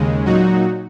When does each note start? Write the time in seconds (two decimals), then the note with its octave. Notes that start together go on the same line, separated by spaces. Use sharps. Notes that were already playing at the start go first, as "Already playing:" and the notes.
Already playing: D#2 C#3 G#3
0.26 A#2 F#3 D#4 F#4